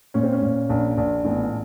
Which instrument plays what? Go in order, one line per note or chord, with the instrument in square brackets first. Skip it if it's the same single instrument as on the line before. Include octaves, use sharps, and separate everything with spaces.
[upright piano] A#2 C#4
C4
C#4
A#2
A#1
A#1
A1 B3